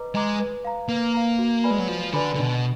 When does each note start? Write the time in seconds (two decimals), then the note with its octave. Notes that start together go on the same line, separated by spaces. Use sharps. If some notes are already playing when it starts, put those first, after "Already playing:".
Already playing: B4 D#5 A#5 D6
0.14 G#3 D#5 A#5 D6
0.40 B4
0.65 F5 A#5
0.89 A#3 B4
1.14 F5 A#5
1.39 F#4
1.64 B4 D5 G#5 B5
1.71 G#3
1.80 F#3
1.88 F3 F#4
2.13 D3 B4 D5 G#5 B5
2.34 D3
2.38 B2 D4